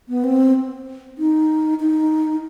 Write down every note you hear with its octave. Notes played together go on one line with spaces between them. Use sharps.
B3
C4
D#4
D#4